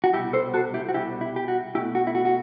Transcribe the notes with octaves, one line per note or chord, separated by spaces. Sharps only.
F#4
C2 B2 G3 E4 G4
A4 C5
F#4 A4
E4 G4
F#4
C2 B2 G3 E4 G4
E4
G4
F#4
B1 B2 A3 E4 G4
F#4
E4
F#4
F#4